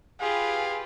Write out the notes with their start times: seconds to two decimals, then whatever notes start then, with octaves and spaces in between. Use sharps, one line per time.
0.20 F4 G4 G#4 B4 F5